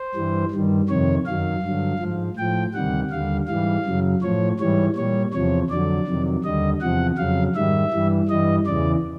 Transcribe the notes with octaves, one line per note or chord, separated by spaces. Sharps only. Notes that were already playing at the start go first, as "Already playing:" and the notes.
Already playing: C5
G2 E3 G3
G2 D#3 G3
F2 C3 D#3 C#5
F#2 D#3 F#3 F5
G2 D3 F#3
G#2 F3
A2 F3 G5
D2 C3 D#3 G3 F#5
D#2 D3 G3 F5
G#2 E3 G3 F5
F#2 C#3 F#3
A2 F3 C#5
G#2 E3 G3 C#5
A#2 G3 C#5
E2 C3 F3 C#5
F2 D3 F#3 D5
F2 C3 D#3 F#3
D#2 D3 G3 D#5
E2 C3 F3 F#5
F2 C#3 F#3 F5
G#2 D#3 G3 E5
G2 E3 G3
G2 E3 G3 D#5
E2 C#3 E3 D5